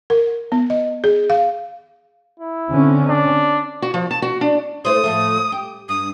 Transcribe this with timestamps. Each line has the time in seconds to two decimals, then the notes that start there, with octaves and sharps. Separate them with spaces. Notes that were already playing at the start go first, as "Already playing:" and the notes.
0.10 A#4
0.52 B3
0.70 D#5
1.04 G#4
1.30 F5
2.40 E4
2.71 D3 C4 C#4
3.09 D4
3.82 F#4
3.94 F3
4.11 A5
4.22 F#4
4.41 D4
4.85 A3 E4 C5 D#6
5.04 A2 F3 A3
5.52 G4
5.89 G2 D#6